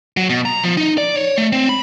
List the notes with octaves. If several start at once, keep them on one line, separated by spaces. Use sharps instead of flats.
F#3
B2
A#5
F3
D#4
D5
C#5
A3
C4
B5